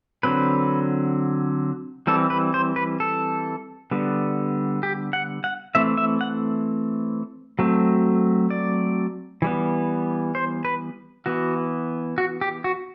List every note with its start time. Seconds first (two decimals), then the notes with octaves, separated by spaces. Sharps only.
0.23 D3 F#3 C4 B4
2.07 E3 G3 C4 A4
2.30 B4
2.54 C5
2.76 B4
3.00 A4
3.91 D3 G3 B3
4.83 G4
5.13 F#5
5.44 F#5
5.75 E3 A3 C4 E5
5.97 E5
6.21 F#5
7.59 F#3 A3 C4
8.50 D5
9.42 E3 G3 B3
10.35 C5
10.65 B4
11.26 E3 B3 F#4
12.18 F#4
12.41 G4
12.64 F#4